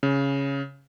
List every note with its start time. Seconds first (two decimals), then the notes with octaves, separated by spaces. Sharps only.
0.03 C#3